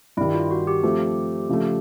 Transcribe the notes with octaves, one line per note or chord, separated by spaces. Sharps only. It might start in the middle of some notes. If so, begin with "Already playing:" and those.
G2 D#3 G3 E4
F4
F#4
G4
F3 A3 C4
C#3 F3 A3